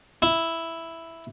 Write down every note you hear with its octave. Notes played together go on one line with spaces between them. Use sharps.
E4